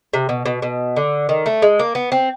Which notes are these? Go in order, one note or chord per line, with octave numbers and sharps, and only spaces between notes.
C3
B2
B2
B2
D3
D#3
A3
G#3
A#3
B3
C4